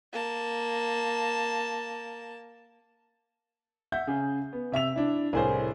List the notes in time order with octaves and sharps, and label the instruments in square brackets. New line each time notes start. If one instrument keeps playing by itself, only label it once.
[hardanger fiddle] A#3 A5
[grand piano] E5 F#5 G6
C#3 G#4
B3
C3 E5 E6 F7
D4 E4
C2 A2 G#4 A#4 C5 C#5